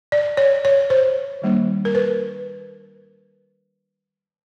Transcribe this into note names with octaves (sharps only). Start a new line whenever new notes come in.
D5
C#5
C#5
C5
D#3 G3 A#3 D4
A#4
B4